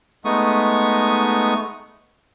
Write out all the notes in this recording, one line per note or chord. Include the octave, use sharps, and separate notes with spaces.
G#3 A3 B3 D#4 C#6 D#6